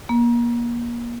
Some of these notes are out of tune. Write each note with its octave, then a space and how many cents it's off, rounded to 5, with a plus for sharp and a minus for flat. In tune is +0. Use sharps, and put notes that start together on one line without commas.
A#3 +30